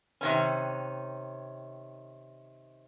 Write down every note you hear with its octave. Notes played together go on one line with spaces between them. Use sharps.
C3 D#3 C#4